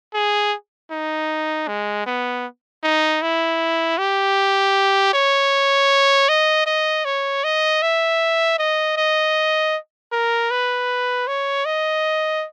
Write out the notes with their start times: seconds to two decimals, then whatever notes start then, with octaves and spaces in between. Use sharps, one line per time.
0.14 G#4
0.91 D#4
1.68 G#3
2.06 B3
2.83 D#4
3.22 E4
3.98 G4
5.14 C#5
6.29 D#5
6.66 D#5
7.05 C#5
7.44 D#5
7.82 E5
8.59 D#5
8.97 D#5
10.12 A#4
10.51 B4
11.27 C#5
11.65 D#5